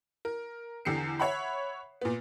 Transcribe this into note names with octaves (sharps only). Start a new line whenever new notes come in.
A#4
E2 D3 G4 C7 C#7
C#5 E5 F#5 B5
A#2 B3